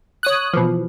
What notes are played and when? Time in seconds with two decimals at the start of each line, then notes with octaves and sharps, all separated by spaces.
0.23 C#5 D#6 F#6
0.53 B2 E3 F3